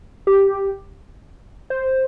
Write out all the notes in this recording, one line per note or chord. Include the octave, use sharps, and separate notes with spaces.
G4
C5